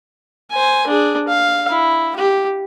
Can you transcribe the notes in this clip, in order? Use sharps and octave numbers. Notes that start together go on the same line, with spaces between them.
C5 G#5
D4 G#4
F5
E4
G4